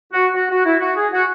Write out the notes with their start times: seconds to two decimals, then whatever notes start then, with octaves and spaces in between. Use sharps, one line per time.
0.13 F#4
0.34 F#4
0.50 F#4
0.65 E4
0.80 F#4
0.96 G#4
1.12 F#4